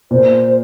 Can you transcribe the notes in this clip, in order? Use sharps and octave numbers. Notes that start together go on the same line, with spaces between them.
A#2 C5